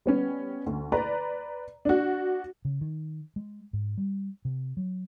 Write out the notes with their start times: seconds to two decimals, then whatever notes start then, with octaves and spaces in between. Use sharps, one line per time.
0.06 G3 B3 C#4
0.66 D2
0.92 B4 D5 A#5
1.85 D4 F#4
2.65 C#3
2.81 D#3
3.36 G#3
3.73 G#2
3.97 G3
4.45 C3
4.77 F#3